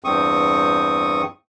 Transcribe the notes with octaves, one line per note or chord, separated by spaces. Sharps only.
E2 G2 C4 C#6 D#6